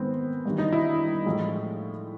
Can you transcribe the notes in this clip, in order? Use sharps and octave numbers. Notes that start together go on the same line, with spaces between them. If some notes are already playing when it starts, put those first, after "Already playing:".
Already playing: G#2 D#3 G#3 B3 C4
G2 D#3 G3
D#4
E4
A2 F3 G#3